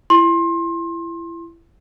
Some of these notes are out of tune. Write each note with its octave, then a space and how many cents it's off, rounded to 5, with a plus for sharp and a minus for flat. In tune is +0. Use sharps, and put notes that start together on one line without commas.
E4 +30 C6 +25